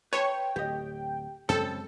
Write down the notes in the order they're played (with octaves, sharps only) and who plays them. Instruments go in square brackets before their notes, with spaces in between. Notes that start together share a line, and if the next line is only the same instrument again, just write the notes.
[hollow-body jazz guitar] B4 A5 C6 [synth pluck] C#5 [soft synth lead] G5
[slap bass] D1 [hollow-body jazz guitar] G4 D#5
[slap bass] F#2 F3 G#3 [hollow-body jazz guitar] C#3 C4 [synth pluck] A4